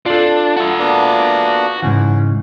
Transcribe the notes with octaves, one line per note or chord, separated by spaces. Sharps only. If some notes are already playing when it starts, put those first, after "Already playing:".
D4 F4 A4
F#4 E5
A#3 B3 D4
G#2 C#3 E3 C#4